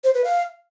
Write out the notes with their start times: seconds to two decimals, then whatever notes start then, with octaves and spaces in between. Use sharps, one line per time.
0.04 C5
0.14 B4
0.24 F5